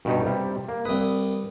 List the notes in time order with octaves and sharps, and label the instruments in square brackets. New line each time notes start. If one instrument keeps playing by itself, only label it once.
[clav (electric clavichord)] G2 B2 D#4
C3 G3
A#3
[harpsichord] C2 D#6 [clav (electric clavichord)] B4